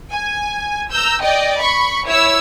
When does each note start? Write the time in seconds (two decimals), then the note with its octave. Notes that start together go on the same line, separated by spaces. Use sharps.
0.13 G#5
0.91 A#5 E6 G6
1.22 D5 D#5 G5
1.60 B5 C#6
2.07 E4 C#5 E6